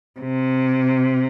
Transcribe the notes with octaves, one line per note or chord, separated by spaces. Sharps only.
C3